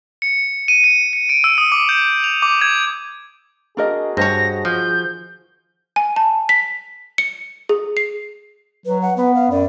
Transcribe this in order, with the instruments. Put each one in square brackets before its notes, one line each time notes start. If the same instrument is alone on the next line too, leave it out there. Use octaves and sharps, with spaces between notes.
[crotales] C#7
D#7
C#7
C#7
D7
E6
D#6
D6
G6
F7
D6
G#6
[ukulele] D4 A#4 D#5 [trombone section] F#4 G#4
[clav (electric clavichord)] G2 C#5 [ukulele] C5 D#5 A5 [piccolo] A#6
[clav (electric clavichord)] F3 [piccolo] G6
[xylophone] G#5
A5
B6
C#7
G#4
C7
[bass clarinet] F#3 [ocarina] B4
[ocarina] F#5
[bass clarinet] B3 [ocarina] B4
[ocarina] F5
[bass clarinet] F#2 [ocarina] D5